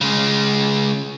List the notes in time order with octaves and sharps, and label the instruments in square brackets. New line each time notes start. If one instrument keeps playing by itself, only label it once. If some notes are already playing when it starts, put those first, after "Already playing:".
[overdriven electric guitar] C#3 G#3